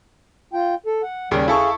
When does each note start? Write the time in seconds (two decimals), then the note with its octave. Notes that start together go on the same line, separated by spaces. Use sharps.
0.53 F4 G5
0.86 A4
1.03 F#5
1.31 D#2 C#3 G3
1.48 E4 G#4 A4 F5 C#6